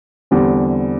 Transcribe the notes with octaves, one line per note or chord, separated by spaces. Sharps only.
E2 D3 G3 C4